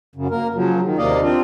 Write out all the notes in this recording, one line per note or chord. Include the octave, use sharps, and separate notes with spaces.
F#2 C#3
A#3 A#4
C#3 F3 F#3
D#3
D#2 C3 A#3 D5 D#5 F5
C4 D4 F4